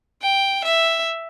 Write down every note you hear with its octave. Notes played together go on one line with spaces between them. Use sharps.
G5
E5